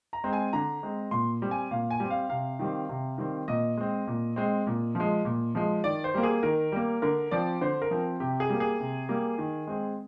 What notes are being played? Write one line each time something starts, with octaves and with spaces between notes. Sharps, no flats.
A#5
G#3 C4
G#5
D3 A#5
G#3 C4
A#2 C6
G3 C4
G#5
A#2 F5
G#5
G3 C4
F5
C3 F5
D#3 G3 C4
C3
D#3 G3 C4
A#2 D#5
G#3 C4
A#2
G#3 C4
A#2
F3 G#3
A#2
F3 G#3
D#3 D5
C5
G3 A#3
G#4
D#3 A#4
G3 A#3
D3 A#4
F3 C4 D5
D3 C5
A#4
F3 C4
C3 G4
G#4
G3 A#3
G#4
C3
G3 A#3
D#3
G#3 C4